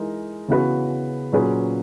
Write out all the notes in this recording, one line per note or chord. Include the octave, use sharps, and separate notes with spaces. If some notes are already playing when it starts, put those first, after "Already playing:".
Already playing: E3 G#3 D#4 A#4
C#3 E3 B3 F#4 B4
A#2 F#3 C#4 G#4 B4